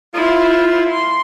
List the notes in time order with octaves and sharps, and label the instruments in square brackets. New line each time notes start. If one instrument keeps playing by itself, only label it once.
[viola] E4 C5 [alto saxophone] F4
[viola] C6